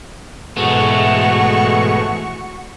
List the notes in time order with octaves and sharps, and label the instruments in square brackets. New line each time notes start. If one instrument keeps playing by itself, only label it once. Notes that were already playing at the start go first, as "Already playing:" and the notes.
[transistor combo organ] G#2 B2 [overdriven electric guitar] E3 A3 [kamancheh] F#4 C#6